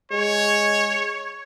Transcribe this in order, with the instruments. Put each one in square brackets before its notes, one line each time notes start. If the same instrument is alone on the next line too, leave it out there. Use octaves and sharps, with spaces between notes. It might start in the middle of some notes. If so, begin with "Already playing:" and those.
[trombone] G#3 [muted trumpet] C#5